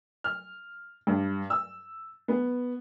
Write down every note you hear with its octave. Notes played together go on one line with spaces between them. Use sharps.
F6
G2
E6
B3